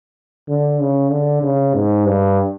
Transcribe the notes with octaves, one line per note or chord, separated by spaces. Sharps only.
D3
C#3
D3
C#3
G#2
G2